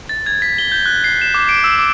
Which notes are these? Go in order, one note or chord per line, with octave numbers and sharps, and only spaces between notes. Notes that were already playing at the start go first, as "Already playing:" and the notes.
A6
G#6
B6
G7
G6
F#6
C7
E7
D6
D7
E6
D6